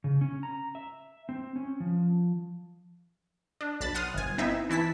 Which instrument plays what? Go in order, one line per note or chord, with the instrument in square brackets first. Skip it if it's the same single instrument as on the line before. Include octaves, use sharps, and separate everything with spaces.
[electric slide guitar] C#3
C#4
A#5
E5
C4
C#4
F3
[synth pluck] D4
B1 A5 B5 A6
F#5 C6 D#6 F6
G1 G#5
B3 C4 D#4 E4 E5
E3 E4 A5 B6